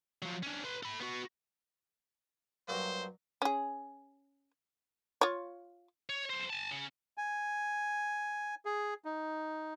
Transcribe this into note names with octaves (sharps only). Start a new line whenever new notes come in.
F3 F#3
C#4 D4
B4 C6
A4 B5
B3 F#4
G2 F#3 A#3 C5
C#4 G#4
F4 C#5
C#5
B1 C5
G#5 A5
C#3 C#4
G#5
G#4
D#4